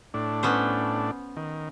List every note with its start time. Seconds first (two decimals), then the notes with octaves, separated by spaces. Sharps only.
0.14 A2 D4
0.43 B3 C#4 C5
1.37 D#3